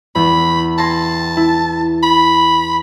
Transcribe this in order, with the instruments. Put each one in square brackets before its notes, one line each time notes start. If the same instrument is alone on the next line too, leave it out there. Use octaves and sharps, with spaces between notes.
[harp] E2 [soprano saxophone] B5
[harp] G#5 C6 A#6 [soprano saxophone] A5
[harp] E4
[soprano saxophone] B5